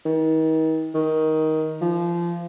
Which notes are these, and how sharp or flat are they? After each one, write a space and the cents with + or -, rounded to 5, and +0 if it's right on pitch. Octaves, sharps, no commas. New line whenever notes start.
D#3 +40
D#3 +15
F3 -25